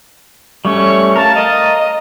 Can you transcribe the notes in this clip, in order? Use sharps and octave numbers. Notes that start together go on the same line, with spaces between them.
G3 A3 C#4 C#6
A#4 F5 A5
D#5